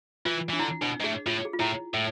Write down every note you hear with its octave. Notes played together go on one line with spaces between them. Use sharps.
E3 F4
E3 D4
D3 E4
B2 D4
G#2
A2 G#4
A2 F4
G#4
F4
A2 E4
A2